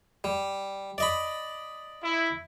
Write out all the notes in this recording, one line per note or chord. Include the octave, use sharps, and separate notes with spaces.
G3
D5 D#5 B5
E4